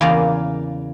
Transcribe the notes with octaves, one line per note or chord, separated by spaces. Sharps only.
E2 C#3 A#3 D5 D#5 F5